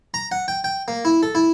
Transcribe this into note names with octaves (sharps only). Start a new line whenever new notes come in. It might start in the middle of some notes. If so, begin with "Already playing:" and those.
A#5
F#5
G5
G5
A#3
E4
A4
E4